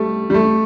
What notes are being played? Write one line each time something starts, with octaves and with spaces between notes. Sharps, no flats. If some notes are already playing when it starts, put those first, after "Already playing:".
Already playing: G3 A3
G3
A3